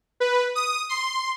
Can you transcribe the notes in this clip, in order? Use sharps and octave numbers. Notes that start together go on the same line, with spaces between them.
B4
D#6
C6